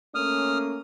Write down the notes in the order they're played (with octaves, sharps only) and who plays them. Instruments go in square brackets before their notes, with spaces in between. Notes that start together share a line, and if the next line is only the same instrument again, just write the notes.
[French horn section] A3 A#3 C#4 [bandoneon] D#6 F6